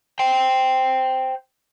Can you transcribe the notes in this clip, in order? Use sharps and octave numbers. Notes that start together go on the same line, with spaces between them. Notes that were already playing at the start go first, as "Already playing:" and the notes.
C5 G5